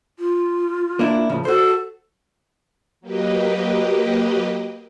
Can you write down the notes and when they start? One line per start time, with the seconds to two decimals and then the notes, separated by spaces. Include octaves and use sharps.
0.19 F4
0.99 A#3 D4 E4
1.29 A2 C#3 F3
1.45 F#4 A4 C5
3.01 F#3 A#3 G4 B4 D#5